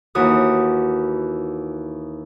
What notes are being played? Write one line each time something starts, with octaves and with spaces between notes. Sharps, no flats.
D#2 E3 F#4 D#6